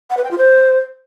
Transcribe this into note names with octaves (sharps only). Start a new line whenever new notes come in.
F#5
B4
G5
F4
C5